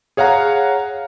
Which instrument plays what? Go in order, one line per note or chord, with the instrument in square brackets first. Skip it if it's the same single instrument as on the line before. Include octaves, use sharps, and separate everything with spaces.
[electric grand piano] G#4 C#5 F5 F#5 A#5